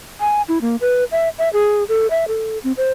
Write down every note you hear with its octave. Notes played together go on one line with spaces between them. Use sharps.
G#5
E4
A#3
B4
E5
E5
G#4
A4
E5
A4
C4
C5